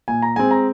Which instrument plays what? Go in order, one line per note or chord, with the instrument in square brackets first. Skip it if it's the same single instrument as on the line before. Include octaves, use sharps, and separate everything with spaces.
[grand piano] A#2 G#5
A#5
G#3 C4 G#5
A#5